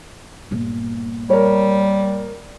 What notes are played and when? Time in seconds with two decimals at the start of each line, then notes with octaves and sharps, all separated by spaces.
0.51 G1 A#2
1.30 G3 A#4 C#5